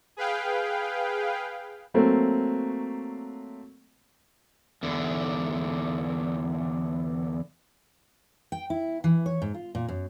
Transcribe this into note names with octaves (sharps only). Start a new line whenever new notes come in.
G#4 B4 F5 G5
F#3 A3 A#3 C4
E2 D3
G5
E4
E3
C#5
G#2
F4
A#2
F#2